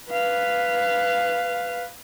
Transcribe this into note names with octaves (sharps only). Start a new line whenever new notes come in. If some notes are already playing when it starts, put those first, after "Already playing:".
B4 F5